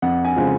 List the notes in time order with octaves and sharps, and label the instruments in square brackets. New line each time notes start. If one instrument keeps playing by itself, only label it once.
[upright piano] F2 F#5
G#5
C#3 F3 G#3